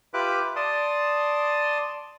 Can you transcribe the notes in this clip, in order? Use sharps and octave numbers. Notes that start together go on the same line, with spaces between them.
F4 G4 B4 E5 D6 F#6
D5 A5 C6 D#6